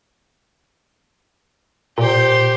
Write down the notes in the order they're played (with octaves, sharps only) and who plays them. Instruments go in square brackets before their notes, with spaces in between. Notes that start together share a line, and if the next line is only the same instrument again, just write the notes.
[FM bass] A#2 [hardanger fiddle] G4 C5